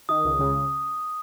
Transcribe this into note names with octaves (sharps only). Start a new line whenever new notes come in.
D#3 D#6
C#2
C#3